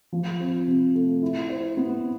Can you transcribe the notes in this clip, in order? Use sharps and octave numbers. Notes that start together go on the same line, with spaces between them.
F3
C4
C3
A3
E4
C5
B3